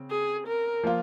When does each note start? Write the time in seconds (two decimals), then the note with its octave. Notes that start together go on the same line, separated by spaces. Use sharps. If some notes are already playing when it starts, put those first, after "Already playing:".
Already playing: C#3 C4
0.11 G#4
0.47 A#4
0.83 F3 A#3 F4